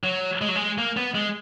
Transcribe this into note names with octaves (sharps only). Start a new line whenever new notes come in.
F#3
G#3
F#3
G#3
A#3
B3
G#3